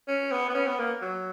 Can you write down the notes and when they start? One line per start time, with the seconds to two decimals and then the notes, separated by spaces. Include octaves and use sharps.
0.08 C#4
0.32 B3
0.50 B3
0.55 C#4
0.67 B3
0.79 A#3
1.02 F#3